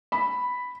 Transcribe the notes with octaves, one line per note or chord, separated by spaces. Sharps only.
B5